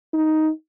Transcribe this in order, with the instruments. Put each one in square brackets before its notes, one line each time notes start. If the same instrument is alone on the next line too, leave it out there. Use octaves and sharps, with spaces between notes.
[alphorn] D#4